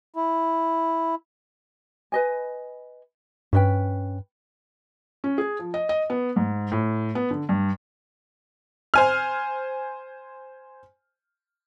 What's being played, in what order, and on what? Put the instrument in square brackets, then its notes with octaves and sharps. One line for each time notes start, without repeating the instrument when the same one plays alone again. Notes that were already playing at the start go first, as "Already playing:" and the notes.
[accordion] E4
[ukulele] B4 D#5 G#5
[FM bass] G2 [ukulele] C#4 B4 G5
[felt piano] C#4
G#4
F3
D#5
D#5
B3
G#2
A2
B3
D3
G2
[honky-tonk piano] C5 G#5 F6